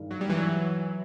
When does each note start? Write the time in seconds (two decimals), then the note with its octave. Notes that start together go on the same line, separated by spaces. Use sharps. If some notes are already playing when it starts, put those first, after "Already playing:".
Already playing: G2 D#3 G#3
0.11 F#3
0.21 G3
0.30 E3 F#3